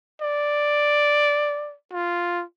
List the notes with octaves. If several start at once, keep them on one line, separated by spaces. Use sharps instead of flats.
D5
F4